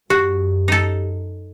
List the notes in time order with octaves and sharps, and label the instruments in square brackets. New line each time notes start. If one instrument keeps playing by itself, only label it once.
[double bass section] F#2 [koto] F#4 [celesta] G4
[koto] D#4 A4